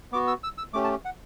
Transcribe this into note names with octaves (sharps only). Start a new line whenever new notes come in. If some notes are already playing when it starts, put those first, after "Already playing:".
B3 F#4 D6
E6
E6
E6
A3 C#4 G4 D6
A5
F#5